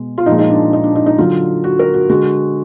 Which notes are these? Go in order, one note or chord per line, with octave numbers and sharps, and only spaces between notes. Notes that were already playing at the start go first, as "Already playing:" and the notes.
Already playing: B2 G#3
F4
A#2 F3 G#3 D#4
D#4
D4
D#4
D4
D#4
D#4
D3 F#3 F4
F#4
A#4
F#4
D3 G#3 F#4